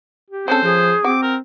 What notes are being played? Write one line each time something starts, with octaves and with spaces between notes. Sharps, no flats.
G4
G#3 C4 C#4 A4 C5
F3 G#4
C4 F#4 D6
A#4